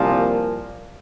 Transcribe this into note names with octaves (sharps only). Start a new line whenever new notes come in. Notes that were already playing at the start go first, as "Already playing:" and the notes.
Already playing: C2 A#2 F3 A#3